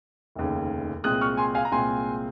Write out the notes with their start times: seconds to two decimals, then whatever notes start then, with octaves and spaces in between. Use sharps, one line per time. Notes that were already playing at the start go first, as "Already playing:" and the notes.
0.36 F1 D#2 C#3
1.04 C2 A#2 G#3 C4 D#6 F#6
1.21 C#6 F6
1.37 G#5 C6
1.55 F5 G#5
1.65 A#5
1.72 C2 A#2 G#3 C4 G#5 C6